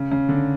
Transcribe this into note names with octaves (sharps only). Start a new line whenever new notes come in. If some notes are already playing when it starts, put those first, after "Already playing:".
Already playing: C#3
C#3
D3